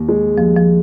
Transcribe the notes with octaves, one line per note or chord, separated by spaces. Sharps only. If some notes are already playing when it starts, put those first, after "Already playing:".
Already playing: D#2
G#3
D#2 F3
F3